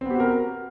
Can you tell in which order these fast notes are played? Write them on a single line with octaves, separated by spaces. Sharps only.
C4 B3 G4 F#4 A#4